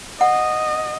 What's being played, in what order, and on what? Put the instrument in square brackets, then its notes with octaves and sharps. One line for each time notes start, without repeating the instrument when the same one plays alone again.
[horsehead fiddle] D#5 [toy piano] F#5